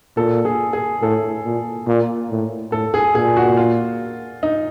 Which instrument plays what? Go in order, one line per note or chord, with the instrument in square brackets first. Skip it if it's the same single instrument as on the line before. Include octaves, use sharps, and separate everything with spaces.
[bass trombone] A#2 [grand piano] A4
[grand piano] G#4
G#4
[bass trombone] A2 [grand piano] A4
[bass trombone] A#2
A#2
A2
[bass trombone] A2 [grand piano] A4
[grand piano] G#4
[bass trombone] A#2 [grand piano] G#4
[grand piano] F#4
F4
D#4